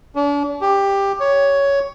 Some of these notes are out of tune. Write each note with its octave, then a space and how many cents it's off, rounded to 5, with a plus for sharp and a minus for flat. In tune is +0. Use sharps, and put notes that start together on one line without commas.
D4 -40
G4 +10
C#5 +10